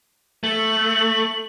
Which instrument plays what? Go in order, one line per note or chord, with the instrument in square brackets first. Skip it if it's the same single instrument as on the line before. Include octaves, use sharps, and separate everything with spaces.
[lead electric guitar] A3 [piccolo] F#7